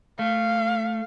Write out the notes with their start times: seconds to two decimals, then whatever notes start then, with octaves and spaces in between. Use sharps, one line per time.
0.19 A3 F5